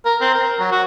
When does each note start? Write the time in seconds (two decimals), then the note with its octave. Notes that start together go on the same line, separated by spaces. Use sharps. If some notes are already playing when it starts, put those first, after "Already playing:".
0.05 A#4
0.21 C4
0.35 A#4
0.60 F#3
0.72 F#4